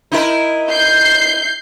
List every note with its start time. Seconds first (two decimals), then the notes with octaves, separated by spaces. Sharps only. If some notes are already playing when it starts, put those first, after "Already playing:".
0.12 D#4 E4 A#4
0.71 G6 C7